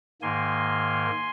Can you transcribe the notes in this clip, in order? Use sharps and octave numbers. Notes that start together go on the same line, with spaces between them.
G#2 D#3 A#3 G#5 C6